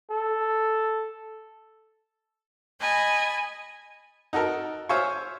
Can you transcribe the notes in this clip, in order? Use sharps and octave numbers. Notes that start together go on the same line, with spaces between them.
A4
D#5 G#5 A5 B5
D#4 F#4 A4 A#4
C5 C#5 E5 F5 G#5 C#6